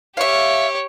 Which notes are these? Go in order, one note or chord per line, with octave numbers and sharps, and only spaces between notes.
G4 C#5 E5 F5